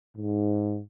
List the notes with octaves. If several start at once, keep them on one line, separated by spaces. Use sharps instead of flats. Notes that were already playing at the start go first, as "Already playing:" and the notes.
G#2